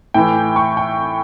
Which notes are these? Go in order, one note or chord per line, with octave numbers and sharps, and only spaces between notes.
A2 E3 G5
C#6
G5